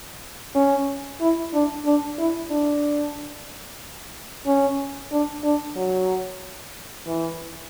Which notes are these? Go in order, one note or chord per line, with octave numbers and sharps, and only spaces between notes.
C#4
E4
D4
D4
E4
D4
C#4
D4
D4
F#3
E3